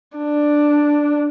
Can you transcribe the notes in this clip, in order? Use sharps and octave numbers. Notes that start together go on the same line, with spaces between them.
D4